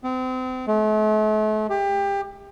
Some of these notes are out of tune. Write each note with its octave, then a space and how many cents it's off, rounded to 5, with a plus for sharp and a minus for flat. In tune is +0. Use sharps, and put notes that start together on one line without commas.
C4 -35
A3 -40
G4 +25